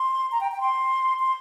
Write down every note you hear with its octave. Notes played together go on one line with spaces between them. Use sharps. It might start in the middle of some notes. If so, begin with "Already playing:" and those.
Already playing: C6
A#5
G5
G5
C6
C6